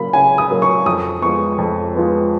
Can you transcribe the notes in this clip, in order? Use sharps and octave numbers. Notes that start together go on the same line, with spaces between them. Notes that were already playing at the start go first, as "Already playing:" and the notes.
Already playing: C#3 F#3 A#3 B5
C#3 G#5
D#6
F#3 A#3
C#6
F2 D#6
F3 G#3 B3 C#6
F2
F3 G#3 B3